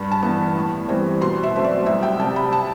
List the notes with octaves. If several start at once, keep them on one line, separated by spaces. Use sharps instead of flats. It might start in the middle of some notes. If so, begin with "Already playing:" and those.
Already playing: G2 B5
A5
E3 B3
A2
E3 G3 C4
B2 C6
E5
F#3 A3 C4
D5
C2 E5
G5
C3 G3 C4 A5
B5
A5